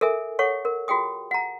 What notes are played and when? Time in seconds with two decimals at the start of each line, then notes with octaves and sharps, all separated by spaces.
0.01 A4 A#4 E5 G#5
0.39 A4 C#5 F#5 C#6
0.65 A#4
0.88 F4 F#4 G#4 G5 D#6
1.31 F#5 A#5